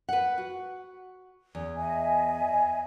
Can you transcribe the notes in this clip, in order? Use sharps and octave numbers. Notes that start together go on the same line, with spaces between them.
B4 F#5
F#4
E2
D#5 E5 G#5